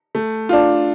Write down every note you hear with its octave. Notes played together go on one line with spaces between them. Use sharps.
A3
D4 F4